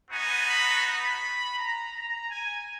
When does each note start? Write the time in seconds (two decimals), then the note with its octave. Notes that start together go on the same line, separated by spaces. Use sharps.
0.10 B3 D#4 F#4 G#5
0.47 B5
0.85 B5
1.57 A#5
1.94 A#5
2.30 G#5